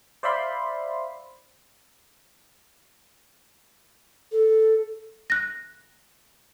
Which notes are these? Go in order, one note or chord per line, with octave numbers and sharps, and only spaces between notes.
C5 D5 E5 F5 B5 C6
A4
F#6 A#6